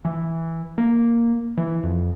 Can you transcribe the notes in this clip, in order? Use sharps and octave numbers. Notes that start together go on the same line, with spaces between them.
E3
A#3
E3
F2